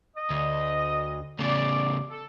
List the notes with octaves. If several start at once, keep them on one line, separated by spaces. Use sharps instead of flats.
D#5
D2
A2 C#3 D5
A4